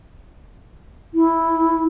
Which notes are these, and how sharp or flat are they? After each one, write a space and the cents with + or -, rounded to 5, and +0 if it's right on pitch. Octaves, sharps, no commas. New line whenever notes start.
E4 -5